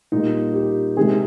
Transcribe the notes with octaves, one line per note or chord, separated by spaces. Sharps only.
A#2 G3 D#4
G4
C3 D#3 G#3 G#4